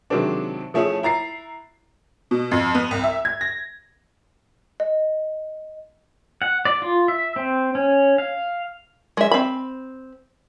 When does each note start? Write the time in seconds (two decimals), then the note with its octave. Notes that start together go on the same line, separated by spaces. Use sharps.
0.10 C3 D#3 F#3 G#3 C4 D4
0.74 F3 A3 C#4 E4 G#4
1.03 E4 A#5 A6 C7
2.31 B2
2.51 F2
2.75 B3
2.91 C2
3.04 E5
3.25 G#6
3.41 A#6
4.80 D#5
6.42 F#5
6.65 D5
6.82 F4
7.08 E5
7.36 C4
7.75 C#4
8.18 F5
9.17 G#3 E5
9.31 C4 B5